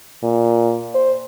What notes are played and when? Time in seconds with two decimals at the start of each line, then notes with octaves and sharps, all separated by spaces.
0.23 A#2
0.95 C5